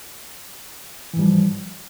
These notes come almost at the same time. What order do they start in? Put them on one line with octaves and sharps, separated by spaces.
E3 G#2 G3 F3